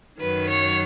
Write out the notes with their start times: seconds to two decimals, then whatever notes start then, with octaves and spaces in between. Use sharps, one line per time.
0.21 F#2 D#3 F#3 B4
0.49 C#5